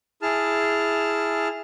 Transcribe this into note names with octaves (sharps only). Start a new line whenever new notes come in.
E4 G#4 A5 F6